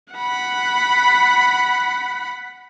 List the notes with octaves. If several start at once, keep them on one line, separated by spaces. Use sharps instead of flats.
F#5 B5